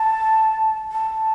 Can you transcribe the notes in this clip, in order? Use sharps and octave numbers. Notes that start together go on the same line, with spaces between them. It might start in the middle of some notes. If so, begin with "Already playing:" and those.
Already playing: A5
A5